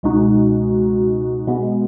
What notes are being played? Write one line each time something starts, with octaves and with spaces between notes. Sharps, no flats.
C#2 B2 G#3 D#4 F#4
B2 G#3 B3